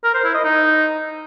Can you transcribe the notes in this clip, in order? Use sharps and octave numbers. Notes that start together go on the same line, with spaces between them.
A#4
C5
E4
D#5
D#4